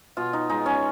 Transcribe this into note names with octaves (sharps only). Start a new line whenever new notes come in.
B2 F4
D#4
G#3 D#4
C#4